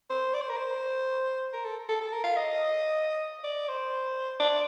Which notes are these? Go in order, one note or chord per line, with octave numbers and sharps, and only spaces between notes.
C5
D5
C5
A#4
C5
A#4
A4
A4
A4
A#4
F5
D#5
D5
C5
D5